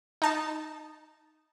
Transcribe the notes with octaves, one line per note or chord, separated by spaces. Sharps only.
D#4 A5